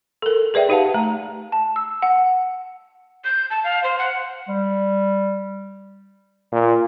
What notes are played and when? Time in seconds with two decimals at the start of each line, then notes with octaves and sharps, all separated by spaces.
0.22 A4 A#4
0.54 G#4 B4 D5 E5 G5
0.69 D#4 G4 B4 F5 F#5 A5
0.94 A3 A#5
1.52 A5
1.76 E6
2.02 F#5
3.24 G6
3.50 A5
3.64 F5
3.84 C5
3.98 F#5
4.48 G3
6.52 A#2